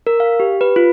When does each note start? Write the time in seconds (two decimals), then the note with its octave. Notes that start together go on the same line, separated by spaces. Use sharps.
0.07 A#4
0.20 F5
0.40 G4
0.61 B4
0.76 F4